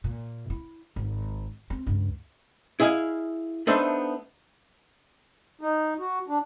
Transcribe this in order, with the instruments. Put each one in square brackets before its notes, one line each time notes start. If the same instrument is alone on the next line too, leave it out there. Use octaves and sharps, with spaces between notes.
[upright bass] A#2
E4
G#1
C4
C#2 G2
[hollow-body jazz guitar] E4 G#4 D#5 F5
A3 B3 D4 D#4 C5 E5
[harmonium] D#4
F#4
D4